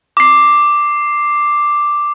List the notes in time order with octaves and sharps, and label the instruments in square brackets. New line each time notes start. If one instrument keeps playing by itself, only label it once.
[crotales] D6 C7